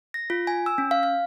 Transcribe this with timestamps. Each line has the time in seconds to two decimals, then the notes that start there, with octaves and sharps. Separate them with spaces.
0.14 A#6
0.30 F4
0.47 G#5
0.66 E6
0.78 C#4
0.91 F5
1.03 F5